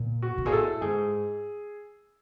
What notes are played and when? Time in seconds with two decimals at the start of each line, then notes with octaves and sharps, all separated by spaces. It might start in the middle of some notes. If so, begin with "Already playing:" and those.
Already playing: A#2
0.22 F#4
0.38 A2
0.45 A#2 G#4
0.52 A2 A4
0.81 G#2 G#4